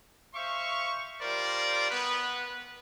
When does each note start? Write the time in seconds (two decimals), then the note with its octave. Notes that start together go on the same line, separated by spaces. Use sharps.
0.34 C5 E5 F5 C#6
1.21 G3 F4 A#4 C5 D5
1.91 B3 B4